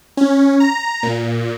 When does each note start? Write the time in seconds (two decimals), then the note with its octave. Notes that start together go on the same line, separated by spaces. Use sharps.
0.17 C#4
0.60 A#5
1.03 A#2